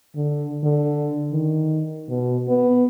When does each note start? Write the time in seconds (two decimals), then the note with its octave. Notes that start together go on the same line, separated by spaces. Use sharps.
0.16 D3
0.63 D3
1.32 D#3
2.09 B2
2.49 B3